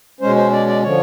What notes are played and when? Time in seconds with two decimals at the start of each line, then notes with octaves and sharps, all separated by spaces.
0.21 B2 G#3 C#4 C5
0.36 C5
0.52 D5
0.67 D5
0.83 D3 F3 C#5